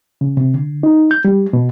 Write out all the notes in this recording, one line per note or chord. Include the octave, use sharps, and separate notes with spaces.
C#3
C3
D3
D#4
G6
G3
B2